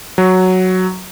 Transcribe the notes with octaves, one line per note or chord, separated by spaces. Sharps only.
F#3